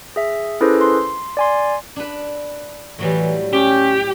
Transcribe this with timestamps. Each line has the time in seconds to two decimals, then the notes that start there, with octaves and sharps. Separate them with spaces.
0.16 G#4 E5
0.61 C#4 E4 G#4 A4 B4 C5
0.81 C6
1.37 D5 G#5 C6
1.96 D4 B4
2.99 A2 E3 F#3 G3
3.53 C#4 G4